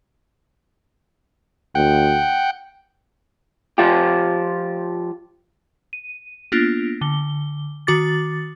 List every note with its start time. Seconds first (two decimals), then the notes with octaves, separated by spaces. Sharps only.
1.75 D2 F#5 G5
3.78 F3 F4 G4
5.93 D#7
6.52 A#3 B3 D4 F4
7.01 D3 G7
7.87 D#3 F#4 D6 A6